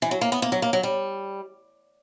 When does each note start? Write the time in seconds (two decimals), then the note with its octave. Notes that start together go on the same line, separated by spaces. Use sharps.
0.02 E3
0.11 F#3
0.21 A#3
0.32 B3
0.42 A#3
0.52 F#3
0.62 A#3
0.73 F#3
0.83 G3